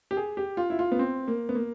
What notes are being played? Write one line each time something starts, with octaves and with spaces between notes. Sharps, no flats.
G4
G#4
G4
F4
E4
F4
B3
C4
A#3
B3
A#3